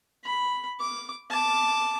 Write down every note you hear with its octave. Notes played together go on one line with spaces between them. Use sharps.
B5
D6
A5 D6